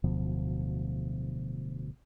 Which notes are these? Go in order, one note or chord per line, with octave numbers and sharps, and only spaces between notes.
D1 D2 B2 F3